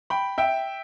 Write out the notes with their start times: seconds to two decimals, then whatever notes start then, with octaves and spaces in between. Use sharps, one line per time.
0.10 G5 B5
0.38 E5 G5